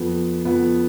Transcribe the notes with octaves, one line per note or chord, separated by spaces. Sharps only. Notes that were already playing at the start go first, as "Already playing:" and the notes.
Already playing: F2 F3 B3
F2 F3 B3